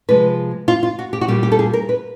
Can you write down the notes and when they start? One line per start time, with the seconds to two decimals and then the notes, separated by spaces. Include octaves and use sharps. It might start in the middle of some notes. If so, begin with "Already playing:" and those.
0.09 C3 F3 G#3 B4
0.68 F4
0.83 F4
0.99 F#4
1.13 G4
1.21 F#4
1.28 A#2 G3 A#3 G4
1.43 G4
1.52 A4
1.59 G#4
1.73 A#4
1.89 B4